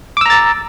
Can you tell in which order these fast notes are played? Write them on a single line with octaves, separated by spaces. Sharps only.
D6 E6 A#5 A6